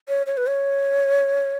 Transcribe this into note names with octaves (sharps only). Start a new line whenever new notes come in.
C#5
C#5
B4
C#5